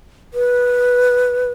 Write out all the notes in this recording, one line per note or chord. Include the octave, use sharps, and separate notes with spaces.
B4